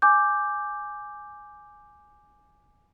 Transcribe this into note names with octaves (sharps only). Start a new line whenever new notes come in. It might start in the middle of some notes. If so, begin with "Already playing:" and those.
G#5 D6 G6